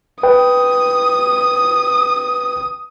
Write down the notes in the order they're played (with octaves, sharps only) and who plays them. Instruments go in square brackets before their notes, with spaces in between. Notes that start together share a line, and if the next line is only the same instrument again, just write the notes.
[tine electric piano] B4 G5 [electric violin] D#6